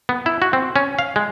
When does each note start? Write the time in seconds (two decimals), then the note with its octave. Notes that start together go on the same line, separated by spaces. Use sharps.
0.09 B3
0.26 E4
0.42 F#4
0.53 C4
0.76 C#4
0.99 F5
1.16 G#3